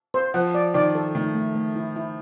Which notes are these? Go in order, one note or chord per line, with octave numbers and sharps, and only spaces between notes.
C5
F3 F#5
D5
D#3 D5
A4
D#3 A3
A3
A3
E4
E4